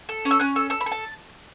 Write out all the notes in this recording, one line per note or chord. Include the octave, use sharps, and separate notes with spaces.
A4
C#4
E6
C#4 F#6
A4 E6
A4 E6
B5
A4
A5